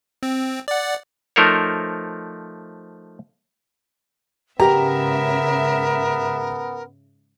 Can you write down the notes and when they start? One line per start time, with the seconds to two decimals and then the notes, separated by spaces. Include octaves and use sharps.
0.23 C4
0.68 D5 F#5
1.36 F3 A3 D#4 A#4 C5 C#5
4.60 G#2 C#3 B3 G4 A#4 E5 A#5